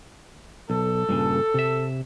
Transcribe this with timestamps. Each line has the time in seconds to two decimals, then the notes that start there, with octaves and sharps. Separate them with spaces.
0.70 B1 A4
1.09 G2 A#2 C#3
1.54 C3 E5